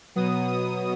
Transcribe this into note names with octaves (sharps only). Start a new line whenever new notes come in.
B2 F#3 B3 D#6
D#6